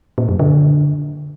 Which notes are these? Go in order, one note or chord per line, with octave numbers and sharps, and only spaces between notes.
A#2
F#2
D3